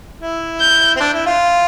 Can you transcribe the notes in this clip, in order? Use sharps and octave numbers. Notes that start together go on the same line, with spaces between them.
E4
G6
C4
D4
E4
F4